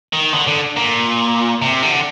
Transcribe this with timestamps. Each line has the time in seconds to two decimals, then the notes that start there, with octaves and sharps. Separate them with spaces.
0.13 D#3
0.34 D3
0.48 D3
0.77 A#2
1.62 C3
1.82 D3